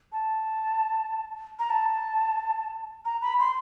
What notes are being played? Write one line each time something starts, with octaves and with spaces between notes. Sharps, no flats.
A5
A#5
A5
A#5
B5
C6